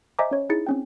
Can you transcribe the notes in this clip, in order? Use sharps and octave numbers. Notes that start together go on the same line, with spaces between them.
C5 D#5 E5 G#5 A#5 D6
C#4 C#5
D#4 E4 G#4 A6 C#7
C4 C#4 G5